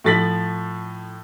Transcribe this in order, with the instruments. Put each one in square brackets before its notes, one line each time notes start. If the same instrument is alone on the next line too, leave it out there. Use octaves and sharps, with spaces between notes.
[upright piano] A2 F3 A6 B6 F#7